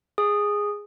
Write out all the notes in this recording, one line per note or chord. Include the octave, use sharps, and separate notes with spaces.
G#4